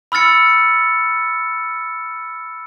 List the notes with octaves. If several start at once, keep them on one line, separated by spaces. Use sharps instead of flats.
B5 E6 F6 A6 C#7